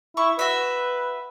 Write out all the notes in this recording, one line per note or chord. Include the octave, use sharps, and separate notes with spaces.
E4 C#6
F#4 B4 E5